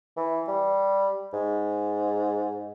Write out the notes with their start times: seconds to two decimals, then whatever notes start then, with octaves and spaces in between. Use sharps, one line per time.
0.17 E3
0.48 G3
1.33 G#2